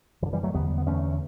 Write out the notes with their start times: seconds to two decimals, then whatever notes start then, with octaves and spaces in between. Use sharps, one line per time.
0.22 F#2 E3
0.26 D3
0.33 E3 G3
0.43 F#3 A3
0.54 E2 D3 G3 B3
0.78 B3
0.86 E2 D3 A3 C#4